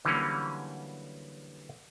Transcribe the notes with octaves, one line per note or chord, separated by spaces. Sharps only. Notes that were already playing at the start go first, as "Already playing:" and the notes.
D3 E3 F#3 G3 A#3 C#4